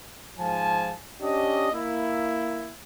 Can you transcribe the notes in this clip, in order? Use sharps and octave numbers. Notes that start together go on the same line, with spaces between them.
G#2 F3 F4 G#5 A5
C#4 D4 G4 D#5
A#3 E4